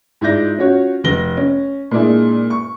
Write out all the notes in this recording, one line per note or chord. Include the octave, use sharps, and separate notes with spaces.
G#2 E4 F4 D5 G6 A#6
C#4 F4 F#4 C#5
F1 A#6 G7
C#4
A#2 G#3 D4 E4 G#4
C#6